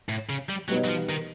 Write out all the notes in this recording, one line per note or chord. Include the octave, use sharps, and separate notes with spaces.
A2
C#3
G3
B2 F#3 G3 B3 D#4
F#3
F3
D#3